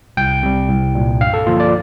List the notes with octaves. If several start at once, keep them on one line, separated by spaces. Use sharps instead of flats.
C2 G5
C3 G3
C2
A#2 G3
G2 F5
A4
D3 F3 A#3 F4
D5